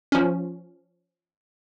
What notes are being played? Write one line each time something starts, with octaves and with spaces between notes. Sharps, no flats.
F3 C#4